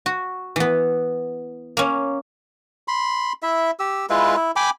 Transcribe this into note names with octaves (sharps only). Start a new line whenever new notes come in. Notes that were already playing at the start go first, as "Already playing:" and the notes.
F#4
E3 B3
A#3 C#4
B5 C6
E4 E5
G4 E6
G#3 E4 F4 B4
E4
G5 G#5 B5 D6